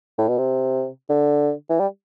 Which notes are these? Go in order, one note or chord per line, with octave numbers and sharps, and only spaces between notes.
A2
B2
C3
D3
E3
G3